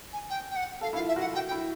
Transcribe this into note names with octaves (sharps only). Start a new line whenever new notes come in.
G#5
G5
G5
F#5
A4 F5
E4 F5
F4
E5
F#4 F#5
F#4 G5
G5
E4